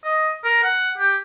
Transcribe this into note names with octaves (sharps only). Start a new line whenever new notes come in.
D#5
A#4
F#5
G4